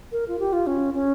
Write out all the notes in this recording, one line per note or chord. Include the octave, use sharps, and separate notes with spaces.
A#4
F4
G4
F4
C#4
C#4